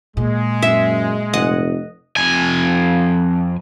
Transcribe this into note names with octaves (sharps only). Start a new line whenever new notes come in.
A#2 G#3
F#2 E5
F1 D#5 F#5
F2 G#5